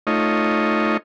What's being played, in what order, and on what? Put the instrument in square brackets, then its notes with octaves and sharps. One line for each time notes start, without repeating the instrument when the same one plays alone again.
[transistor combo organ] A3 D#4 F4 C#5 D#5